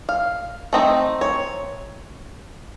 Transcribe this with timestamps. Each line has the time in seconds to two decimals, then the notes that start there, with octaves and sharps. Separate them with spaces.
0.09 F5
0.73 A3 C4 D#4
1.21 C#5